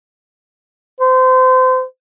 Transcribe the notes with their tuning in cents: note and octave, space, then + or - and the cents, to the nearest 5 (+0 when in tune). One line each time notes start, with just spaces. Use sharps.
C5 -30